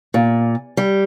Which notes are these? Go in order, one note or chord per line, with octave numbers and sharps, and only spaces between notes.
A#2
G3